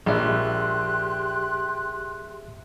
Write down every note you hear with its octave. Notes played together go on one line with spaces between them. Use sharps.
A#1 G4 G#4 E5 C6 F#6